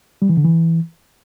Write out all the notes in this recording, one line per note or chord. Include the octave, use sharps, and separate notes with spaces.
G3
E3
D3
E3